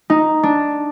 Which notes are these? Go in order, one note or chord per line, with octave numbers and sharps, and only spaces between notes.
D#4
D4